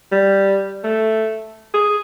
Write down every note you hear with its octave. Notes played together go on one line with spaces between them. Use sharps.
G3
A3
G#4